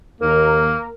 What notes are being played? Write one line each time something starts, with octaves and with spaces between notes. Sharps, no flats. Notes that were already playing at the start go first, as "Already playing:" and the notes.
D#2 A#3 A#4